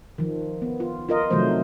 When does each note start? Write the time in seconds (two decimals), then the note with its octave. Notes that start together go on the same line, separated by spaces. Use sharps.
0.18 D#3 F3
0.62 B3
0.80 F4
1.09 F4 A#4 D#5
1.30 C3 D#3 F3 F#3 A3 C5